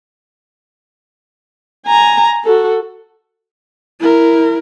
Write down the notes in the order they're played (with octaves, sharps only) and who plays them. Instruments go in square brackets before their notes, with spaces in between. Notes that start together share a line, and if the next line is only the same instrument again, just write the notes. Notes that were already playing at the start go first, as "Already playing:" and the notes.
[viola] G#5 A#5
F#4 A4
[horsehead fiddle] E4 A#4